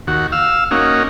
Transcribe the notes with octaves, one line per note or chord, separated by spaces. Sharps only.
D#2 F#4
F5 E6
A#3 C#4 D#4 F#4